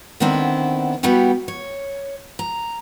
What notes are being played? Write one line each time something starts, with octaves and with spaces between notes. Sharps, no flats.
D3 D#3 B3 C4 D4 E4
G3 B3 E4 F#4 G4
C#5
A#5